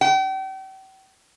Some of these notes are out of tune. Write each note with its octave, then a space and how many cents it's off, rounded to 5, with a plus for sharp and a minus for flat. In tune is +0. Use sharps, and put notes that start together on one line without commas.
G5 -40